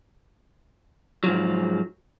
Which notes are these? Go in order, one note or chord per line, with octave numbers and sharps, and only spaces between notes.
G#2 F3 F#3